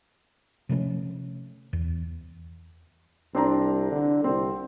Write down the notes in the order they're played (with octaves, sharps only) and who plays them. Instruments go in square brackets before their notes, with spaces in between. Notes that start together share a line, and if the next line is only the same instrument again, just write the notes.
[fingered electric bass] C3 F3 A3 C#4
E2
[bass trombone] C2 [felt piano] C4 D4 A#5
[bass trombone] D3
[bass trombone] C2 [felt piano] C4